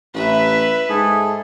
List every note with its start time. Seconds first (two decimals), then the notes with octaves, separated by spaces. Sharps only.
0.14 A1 B4 E5
0.89 G#2 G#4 A4